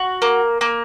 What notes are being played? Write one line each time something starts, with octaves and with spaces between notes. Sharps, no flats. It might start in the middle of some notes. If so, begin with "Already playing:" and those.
Already playing: F#4
A#3
A#3